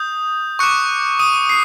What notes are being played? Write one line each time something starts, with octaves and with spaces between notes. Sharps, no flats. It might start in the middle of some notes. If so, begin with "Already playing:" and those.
Already playing: D#6 G6
C#6 D6 F#6 C#7
D#6 D#7
C7